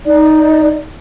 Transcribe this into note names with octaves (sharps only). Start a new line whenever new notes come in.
D#4 D5